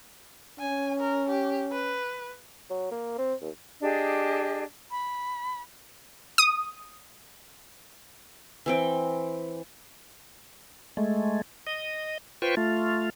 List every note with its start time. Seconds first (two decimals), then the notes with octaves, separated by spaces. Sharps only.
0.59 C#4 G#5
1.00 A#4
1.29 G4
1.72 B4
2.70 F#3
2.91 A#3
3.18 C4
3.42 D#2
3.82 D4 G4 G#4 D#5
4.91 B5
6.38 D#6
8.66 E3 C4 G5
10.97 G#3 A3
11.67 D#5
12.42 F4 B4 C5 G5 C#6
12.57 A3 F4